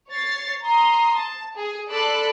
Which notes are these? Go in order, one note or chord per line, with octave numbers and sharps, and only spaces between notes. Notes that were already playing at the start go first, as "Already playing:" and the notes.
C#5 A6 C7
A#5 C6 D#6
A5
G#4
A4 D5 B5 C6 E6 F#6